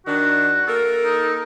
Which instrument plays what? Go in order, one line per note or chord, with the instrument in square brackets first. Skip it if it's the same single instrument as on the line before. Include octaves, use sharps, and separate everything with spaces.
[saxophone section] D#3 D4 [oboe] F#4
[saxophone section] A#3 A4 A#4
[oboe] D#4